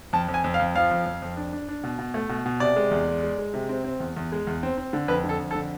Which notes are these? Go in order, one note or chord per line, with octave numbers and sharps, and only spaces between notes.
F2 A5
F2
G#5
F2
F5
F2
F3 F5
F2
F2
F2
D4
D4
D4
B2
B2
A3
B2
B2
C3 D5
G#3
E2
G#3
G#3
G#3
C3
C4
C4
E2
E2
G#3
E2
C4
C4
D3
F2 B4
D3
A4
F2
A4
D3